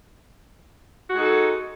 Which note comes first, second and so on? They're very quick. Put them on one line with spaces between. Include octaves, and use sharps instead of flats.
F#4 G#3 D#4 A4